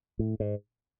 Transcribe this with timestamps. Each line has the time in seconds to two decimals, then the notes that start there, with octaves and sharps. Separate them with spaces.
0.19 A2
0.40 G#2